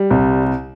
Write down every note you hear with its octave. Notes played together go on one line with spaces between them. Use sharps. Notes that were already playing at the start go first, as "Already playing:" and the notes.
Already playing: G3
C2